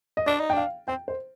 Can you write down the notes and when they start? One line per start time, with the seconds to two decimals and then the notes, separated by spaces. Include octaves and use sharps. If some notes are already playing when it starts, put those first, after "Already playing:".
0.17 D#5
0.26 D4 D5
0.40 D#4
0.50 G5
0.53 D4 F5
0.88 C4 G5
1.08 C5